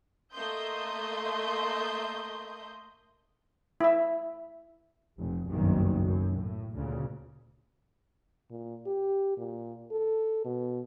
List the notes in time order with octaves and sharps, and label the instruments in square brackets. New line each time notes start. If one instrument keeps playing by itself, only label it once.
[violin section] A3 A#3 D#5 E5 C6 G6
[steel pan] E4 E5
[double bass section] F1
F#1 B1 G2 D#3
F#2
A2
D2 A#2 C#3
[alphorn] A#2
G4
A#2
A4
B2